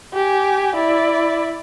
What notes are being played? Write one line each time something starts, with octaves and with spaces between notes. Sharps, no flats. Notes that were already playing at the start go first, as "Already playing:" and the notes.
G4 G#5
E4 D5